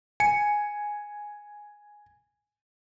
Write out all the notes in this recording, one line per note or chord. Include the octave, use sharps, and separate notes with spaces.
G#5 C#7